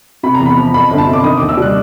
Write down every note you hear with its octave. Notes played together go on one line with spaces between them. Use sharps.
C3 B5
A#5
E2
B5
F3
F2 B5
G1
A5
C3
D6
D#3 D#6
D6
D#2
E6
G3 F#6